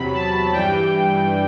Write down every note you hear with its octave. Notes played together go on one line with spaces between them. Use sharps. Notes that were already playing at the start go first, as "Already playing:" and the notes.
Already playing: E2 C3 F#3 B5
A5
G2 E3 G3 G5